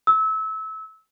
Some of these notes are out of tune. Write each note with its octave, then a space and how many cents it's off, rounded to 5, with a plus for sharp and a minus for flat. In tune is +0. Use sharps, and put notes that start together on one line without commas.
E6 -25